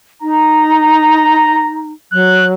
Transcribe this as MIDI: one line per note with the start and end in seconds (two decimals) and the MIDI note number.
0.22 1.92 63
0.22 1.85 82
2.12 2.54 54
2.12 2.47 90